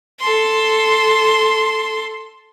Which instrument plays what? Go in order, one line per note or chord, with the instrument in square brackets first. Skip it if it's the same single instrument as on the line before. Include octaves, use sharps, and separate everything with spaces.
[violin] A4 C6